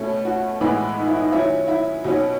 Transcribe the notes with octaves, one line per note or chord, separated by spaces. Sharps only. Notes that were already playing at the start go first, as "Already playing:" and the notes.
Already playing: B2 A3 C#4
F#4
A2 E3 G#3 B3
D#4
E4
D#4
D#3 F#3 C#4 E4
E4
B2 F#3 C#4 D#4